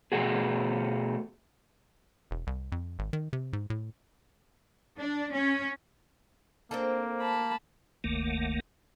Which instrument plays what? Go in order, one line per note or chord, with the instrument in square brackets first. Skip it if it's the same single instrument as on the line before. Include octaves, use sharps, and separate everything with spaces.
[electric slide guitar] B2 A3 F#4 G#4
[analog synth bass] E1
C2
F2
G#1
D#3
C3
G#2
A2
[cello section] D4
C#4
[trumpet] A#3 [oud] C4 D4 A4
[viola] A5 B5
[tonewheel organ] F#1 D2 D#3 A3 A#3